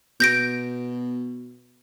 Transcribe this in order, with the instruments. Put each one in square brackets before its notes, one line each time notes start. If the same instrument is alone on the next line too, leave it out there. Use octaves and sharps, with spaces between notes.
[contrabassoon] B2 [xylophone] G6 A#6 D7